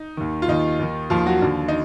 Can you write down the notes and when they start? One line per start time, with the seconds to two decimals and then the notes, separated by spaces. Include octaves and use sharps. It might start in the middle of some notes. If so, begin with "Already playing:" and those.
Already playing: D#4
0.17 D#2 D#3
0.42 F4
0.48 D#2 D#3 D#4
0.79 D#2 D#3
1.10 D#2 D#3 F3 F4
1.26 F#3 F#4
1.42 D#2 D3 F3
1.68 D#4